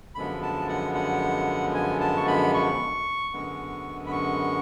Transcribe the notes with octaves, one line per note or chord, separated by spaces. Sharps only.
F#2 D3 F3 G#3 B3 B5
A5
F#5
F#5
G#5
A5
C#6
B5
C#6
F#2 D3 G#3 B3
B5
C#6